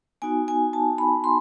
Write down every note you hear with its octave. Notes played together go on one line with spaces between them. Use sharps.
B3 D#4 F#4 G#5
G#5
A5
B5
C6